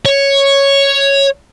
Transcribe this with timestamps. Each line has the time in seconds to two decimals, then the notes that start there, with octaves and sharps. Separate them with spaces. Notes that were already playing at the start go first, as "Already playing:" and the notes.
0.05 C#5